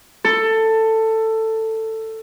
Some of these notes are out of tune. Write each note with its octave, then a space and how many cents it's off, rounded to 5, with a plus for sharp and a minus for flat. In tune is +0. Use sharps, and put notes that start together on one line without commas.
A4 +15